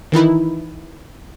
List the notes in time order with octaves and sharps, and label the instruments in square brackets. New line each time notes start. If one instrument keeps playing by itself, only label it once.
[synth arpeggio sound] D#3 E3 D#4 E4